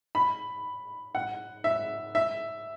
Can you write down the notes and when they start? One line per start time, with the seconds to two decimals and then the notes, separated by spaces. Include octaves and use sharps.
0.15 B5
1.15 F#5
1.64 E5
2.15 E5